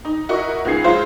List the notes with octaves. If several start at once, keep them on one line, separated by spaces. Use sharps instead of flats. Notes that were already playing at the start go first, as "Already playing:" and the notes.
D#4
E4 F#4 A#4 D#5 C#6
C#2 B3 D#4 G#4 G#6 C7
F#3 G#3 F4 C5